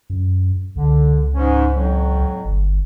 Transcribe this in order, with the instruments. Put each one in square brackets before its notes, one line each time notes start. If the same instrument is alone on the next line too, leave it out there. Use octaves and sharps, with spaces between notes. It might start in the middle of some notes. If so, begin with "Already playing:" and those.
[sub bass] F#2
[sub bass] C#2 [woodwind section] D3
[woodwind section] G#2 C#4
F2 A2 F#3
[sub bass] G1